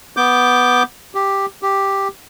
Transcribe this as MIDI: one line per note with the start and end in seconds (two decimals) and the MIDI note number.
0.17 0.83 59
0.17 0.83 86
0.17 0.83 91
1.15 1.46 67
1.62 2.08 67